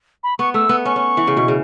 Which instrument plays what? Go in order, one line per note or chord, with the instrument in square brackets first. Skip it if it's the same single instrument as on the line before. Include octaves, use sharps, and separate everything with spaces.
[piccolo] B5
[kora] B3 [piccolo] C#6
[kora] A3 [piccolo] E6
[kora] B3
[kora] C#4 [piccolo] C#6
[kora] C#4
E3
C#3
B2
C#3